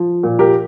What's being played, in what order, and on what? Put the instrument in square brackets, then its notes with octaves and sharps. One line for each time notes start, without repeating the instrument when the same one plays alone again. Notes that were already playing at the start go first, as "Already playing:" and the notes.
Already playing: [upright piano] F3
A#2
G4 A#4